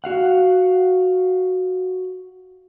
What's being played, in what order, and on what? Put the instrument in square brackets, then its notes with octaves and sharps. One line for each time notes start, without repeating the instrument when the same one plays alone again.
[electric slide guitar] F#4 F5 F#5